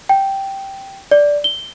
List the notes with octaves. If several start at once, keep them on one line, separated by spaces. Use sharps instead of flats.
G5
D5
G7